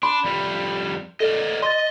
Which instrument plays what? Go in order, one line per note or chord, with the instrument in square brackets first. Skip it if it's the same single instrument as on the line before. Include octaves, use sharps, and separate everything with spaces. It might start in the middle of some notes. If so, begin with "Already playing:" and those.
[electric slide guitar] D4 [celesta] B5 C6
[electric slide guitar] F2 G3
[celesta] A4 [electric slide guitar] A#4 D5 D#5
[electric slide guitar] D#5 [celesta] C6 A6